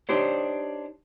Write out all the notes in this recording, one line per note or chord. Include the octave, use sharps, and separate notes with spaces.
D4 D#4 G4 C5 C#5